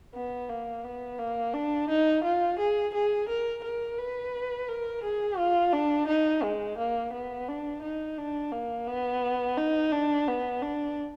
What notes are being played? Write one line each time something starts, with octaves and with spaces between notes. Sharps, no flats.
B3
A#3
B3
A#3
D4
D#4
F4
G#4
G#4
A#4
A#4
B4
A#4
G#4
F4
D4
D#4
G#3
A#3
B3
D4
D#4
D4
A#3
B3
D#4
D4
B3
D4